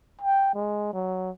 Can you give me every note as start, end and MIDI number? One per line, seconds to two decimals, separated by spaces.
0.21 0.54 79
0.55 0.90 56
0.93 1.30 54